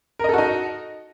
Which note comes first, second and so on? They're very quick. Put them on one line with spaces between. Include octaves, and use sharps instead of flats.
A#4 D#5 A4 F#4 D#4